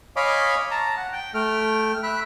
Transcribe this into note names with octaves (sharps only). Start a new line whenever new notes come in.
C#5 D#5 F5 G#5 B5 D6
A5 A#5
F#5
G5
A3 G5 F6
E5 B5 F#6